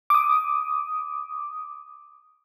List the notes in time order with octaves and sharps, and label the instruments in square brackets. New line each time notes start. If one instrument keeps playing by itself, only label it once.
[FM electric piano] D6 D#6